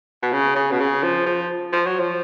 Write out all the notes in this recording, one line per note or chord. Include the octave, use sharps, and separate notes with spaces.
B2
C#3
C#3
B2
C#3
F3
F3
F3
F#3
F3